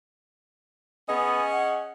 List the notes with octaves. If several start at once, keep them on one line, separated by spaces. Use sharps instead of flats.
B3 C#4 G#4 D#5
F#5